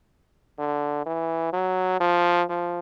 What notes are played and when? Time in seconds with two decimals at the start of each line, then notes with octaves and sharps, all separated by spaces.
0.58 D3
1.06 E3
1.53 F#3
2.00 F3
2.49 F3